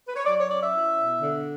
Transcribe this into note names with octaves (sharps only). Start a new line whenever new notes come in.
B4
C#5
F#3 D5
C#5
C#4 D5
E5
E4
B2
D3